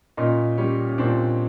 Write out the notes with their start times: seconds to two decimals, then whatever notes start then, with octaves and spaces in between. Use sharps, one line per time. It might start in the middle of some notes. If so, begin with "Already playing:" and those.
0.17 A#2 C#4 D#4
0.58 G3 C#4
0.89 C#4
0.98 A#2 C4 D4